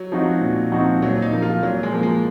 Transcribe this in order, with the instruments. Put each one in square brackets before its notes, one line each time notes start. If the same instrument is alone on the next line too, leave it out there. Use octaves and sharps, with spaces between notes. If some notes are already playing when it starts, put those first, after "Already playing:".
Already playing: [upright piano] F#3
[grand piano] F3 C4 D#4 F#4
A#2
F3 C4 D#4 F#4
[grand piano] A#2 [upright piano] F#3
[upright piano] D#4
[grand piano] F3 A#3
[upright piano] F4
[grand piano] A#2 [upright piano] F#3
[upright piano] G#3
[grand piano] F3 A#3
[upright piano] G#3